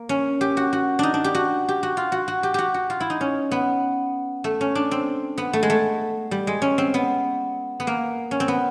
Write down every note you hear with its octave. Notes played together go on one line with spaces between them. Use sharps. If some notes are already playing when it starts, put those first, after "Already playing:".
Already playing: A#3
C#4
G4
F#4
F#4
D4 D#4
D4
G4
F#4
G4
F#4
F4
F#4
F#4
G4
F#4 G4
F#4
F4
E4
D#4
C#4
B3
A3
C#4
D4
C4
B3
A3
G#3
A3
G3
G#3
C#4
C4
B3
B3
A#3
C#4
C4
B3